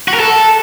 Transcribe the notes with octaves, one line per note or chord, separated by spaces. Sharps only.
F#4
A#4
A4